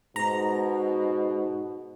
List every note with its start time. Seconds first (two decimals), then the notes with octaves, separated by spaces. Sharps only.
0.16 G#2 B2 A#5